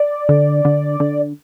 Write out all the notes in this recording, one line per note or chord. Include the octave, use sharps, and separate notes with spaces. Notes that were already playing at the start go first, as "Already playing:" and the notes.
Already playing: D5
D3
D3
D3